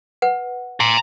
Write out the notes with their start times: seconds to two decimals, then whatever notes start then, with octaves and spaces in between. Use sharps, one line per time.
0.22 B4 F#5
0.80 A#5 C6